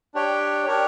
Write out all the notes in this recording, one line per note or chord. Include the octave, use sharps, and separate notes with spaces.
D4 G4 C#5 G5
D4 G4 A#4 C#5